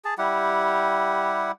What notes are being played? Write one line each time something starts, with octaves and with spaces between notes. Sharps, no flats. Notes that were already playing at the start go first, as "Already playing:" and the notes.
G#4 A5
G3 E4 G4 F#5